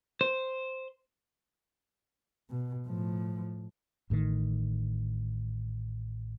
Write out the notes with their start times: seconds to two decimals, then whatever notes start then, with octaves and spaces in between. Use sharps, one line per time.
0.21 C5
2.50 B2
2.86 A2 F3
4.10 A1 A2 D3 D#3